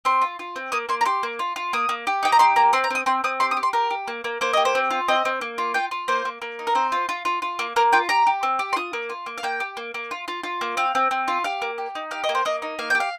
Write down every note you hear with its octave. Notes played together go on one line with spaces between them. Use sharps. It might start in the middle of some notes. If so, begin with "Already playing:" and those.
C4 C6
F4
F4
C4
A#3 D#6
A#3 C6
A#5
G4 C6
A#3
F4
F4
A#3 D#6
A#3
G4
D#4 G5
A#5
G4 C6
A#3 A#5
C4 C6
A#5
C4 D#6
C4 C6
C4 D#6
G4 C6
D#6
G4
C6
G4 A#4
G4
A#3
A#3
A#3 C5
G4 D#5
C5
C4
F4
C4 D#5
C4
A#3
F4
F4 G5
F4
A#3 C5
A#3
A#3
D#4
A#4
C4 C5
F4
F4
F4
F4
A#3
A#3 A#4
F4 G5
G4 A#5
G4
C4
G4
C6
F4 D#6
A#3
F4
A#3
F5
A#3 G5
G4
A#3
A#3
F4
F4
F4
A#3
C4 F5
C4
C4
F4
G4 F5
A#3
G4
D#4
G4 F5
D#5
A#3
C5
A#3 D#5
D#4
A#3 F5
G4 G5
F5